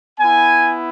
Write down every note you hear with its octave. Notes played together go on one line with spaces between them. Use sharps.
B3 E4 G#5